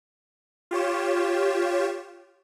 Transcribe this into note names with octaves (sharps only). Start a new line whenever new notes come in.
F4 G4 C#5 E7